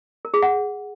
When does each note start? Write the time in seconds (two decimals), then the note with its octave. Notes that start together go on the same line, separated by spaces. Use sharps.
0.25 A#4
0.34 G#4
0.43 F#5